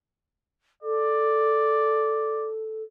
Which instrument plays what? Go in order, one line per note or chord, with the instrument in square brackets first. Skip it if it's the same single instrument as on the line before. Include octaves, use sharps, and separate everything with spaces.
[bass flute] A4 [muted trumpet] D5